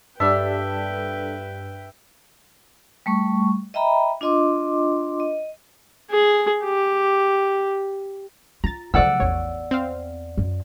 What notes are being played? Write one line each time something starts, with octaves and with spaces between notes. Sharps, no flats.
G2 G3 D4 A4 B4 E5 G5
G3 A3 C#6
D#5 E5 G5 A#5 B5
D4 F4 D#5 C6 D6
D#5
G#4
G4
F4 A#5 A6
C#3 F3 F#3 A3 D5 F#5 E6
A1 E2 C#5
C4 F5
F#2